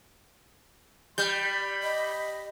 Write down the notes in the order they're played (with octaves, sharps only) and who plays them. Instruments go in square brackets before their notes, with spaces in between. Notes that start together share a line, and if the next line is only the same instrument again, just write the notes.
[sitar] G3 [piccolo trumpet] B5 [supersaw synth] G6
[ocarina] D#5